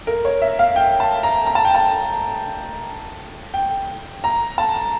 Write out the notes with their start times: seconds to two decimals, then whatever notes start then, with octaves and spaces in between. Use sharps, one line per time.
0.07 A#4
0.25 C#5
0.42 E5
0.59 F5
0.76 G5
1.00 A5
1.23 A#5
1.46 A#5
1.55 A5
1.65 G5
1.75 A5
3.54 G5
4.24 A#5
4.58 A5